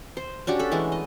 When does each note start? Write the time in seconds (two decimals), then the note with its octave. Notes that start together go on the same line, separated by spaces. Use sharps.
0.17 C5
0.47 C#4 D4 F#4 G4
0.59 A4 B5
0.72 E3 G#3 A3
0.92 D#5